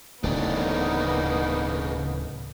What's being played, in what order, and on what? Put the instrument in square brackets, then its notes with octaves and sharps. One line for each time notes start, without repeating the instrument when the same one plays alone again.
[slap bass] D1 E3 [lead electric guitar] C#3 D4 [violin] A#3 B3 [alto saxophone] D#4